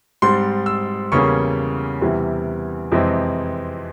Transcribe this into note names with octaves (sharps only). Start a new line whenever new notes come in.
G#2 G3 C4 C6
E6
E2 C#3 G3 A#3 C#4 C#6
E2 C3 E3 G3
F2 C3 E3 G#3 C4